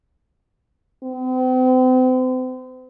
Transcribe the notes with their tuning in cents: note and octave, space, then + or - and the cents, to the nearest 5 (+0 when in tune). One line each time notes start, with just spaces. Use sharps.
C4 -40